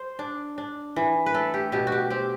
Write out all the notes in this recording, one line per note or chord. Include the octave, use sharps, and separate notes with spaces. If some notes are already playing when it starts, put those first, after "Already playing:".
Already playing: C5
D4
D4
E3
B4
A3 A4
G4
B2 G4
F#4
G4
C4 G4